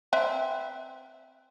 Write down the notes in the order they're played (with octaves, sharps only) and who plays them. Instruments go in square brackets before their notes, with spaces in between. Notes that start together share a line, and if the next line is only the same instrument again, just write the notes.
[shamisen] C4 B4 E5